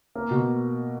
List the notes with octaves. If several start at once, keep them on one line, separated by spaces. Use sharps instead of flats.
A#3
B2